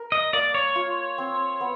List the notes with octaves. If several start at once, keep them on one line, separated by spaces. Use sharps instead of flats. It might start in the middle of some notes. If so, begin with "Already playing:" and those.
Already playing: A#4
D#5
A#3 D5
C#5
F4
C4
B3